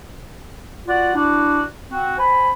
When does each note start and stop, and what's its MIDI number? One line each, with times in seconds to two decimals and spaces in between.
0.87 1.11 65
0.87 1.11 66
0.87 1.11 74
0.87 1.11 78
1.14 1.61 62
1.14 1.61 64
1.14 1.61 66
1.14 1.61 74
1.91 2.15 60
1.91 2.15 66
2.18 2.50 72
2.18 2.50 80
2.18 2.50 83